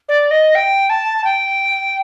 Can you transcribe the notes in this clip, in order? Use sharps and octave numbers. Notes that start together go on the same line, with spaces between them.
D5
D#5
G5
A5
G5